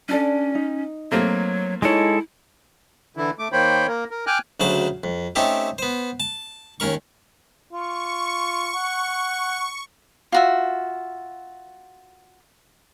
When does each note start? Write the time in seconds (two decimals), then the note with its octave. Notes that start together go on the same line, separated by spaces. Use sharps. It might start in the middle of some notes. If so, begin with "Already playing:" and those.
0.09 C#4 D4 A4 D5
0.55 D#4
1.12 F#3 A3 A#3 C4
1.82 G#3 D#4 E4 A4 C#5 D#5
3.17 D3 E3 E4
3.39 A3 D6
3.52 D#3 A#3 C5 C#5 G5 B5
3.87 A#3 A#4
4.11 A#4
4.27 G5 G#5 D6 F6 F#6
4.60 D2 C#3 F#3 C5 A5
5.04 F2
5.35 A3 C4 C#4 D#4 G4 A4
5.78 B3 C5
6.20 A5
6.80 D#2 C#4 A#4 C#6
7.73 F4 C#6
8.75 F#5
10.32 F4 F#4 E5